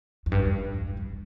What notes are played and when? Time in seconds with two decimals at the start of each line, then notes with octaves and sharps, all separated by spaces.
0.26 F2
0.32 G2
0.45 E2
0.60 F2
0.74 G2
0.88 A2
0.97 G2